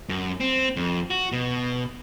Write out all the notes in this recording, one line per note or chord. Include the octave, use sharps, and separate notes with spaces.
F#2
C4
F2
F#4
B2